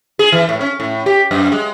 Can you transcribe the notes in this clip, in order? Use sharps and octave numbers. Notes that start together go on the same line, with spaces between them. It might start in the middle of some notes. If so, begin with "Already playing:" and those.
G#4
E3
A2
C#4
A2
G4
F#2
G#3